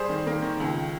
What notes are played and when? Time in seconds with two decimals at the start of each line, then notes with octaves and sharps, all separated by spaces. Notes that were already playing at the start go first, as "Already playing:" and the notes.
Already playing: G3 G#4 C5
0.09 D#3
0.27 A#3
0.42 D#3
0.60 C#2